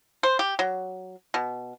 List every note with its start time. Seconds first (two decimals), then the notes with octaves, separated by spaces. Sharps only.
0.23 C5
0.39 G4
0.59 F#3
1.34 B2